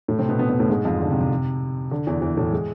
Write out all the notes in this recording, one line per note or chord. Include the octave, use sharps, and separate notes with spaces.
A2 A3
C3 C4
B2 B3
B2 B3
B2 B3
A2 A3
G#2 G#3
F2 F3
D3
C3
C3
D3
E2 E3
E2 E3
A2 A3
G#3